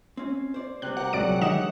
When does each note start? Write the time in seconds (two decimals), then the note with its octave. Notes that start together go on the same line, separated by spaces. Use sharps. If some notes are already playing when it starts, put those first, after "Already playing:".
0.17 C4 C#4
0.54 C5 D5
0.82 C3 G3 B3 C4 F#6
0.97 G4 A#4 F#5
1.13 C2 A#2 F#3 G#3 D5 D7
1.41 D#3 D4 G4 D#5 E5 F#5 E7